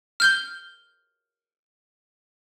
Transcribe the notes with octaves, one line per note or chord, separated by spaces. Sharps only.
F6 G6 G7